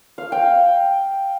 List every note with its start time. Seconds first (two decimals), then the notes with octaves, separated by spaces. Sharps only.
0.18 F5
0.32 G5